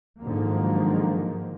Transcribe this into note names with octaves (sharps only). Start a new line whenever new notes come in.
G#2 D3 D#3 F3 F#3 A#3